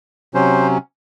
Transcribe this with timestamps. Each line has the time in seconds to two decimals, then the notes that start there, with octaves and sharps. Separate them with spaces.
0.34 C3 F#3 C#4 C5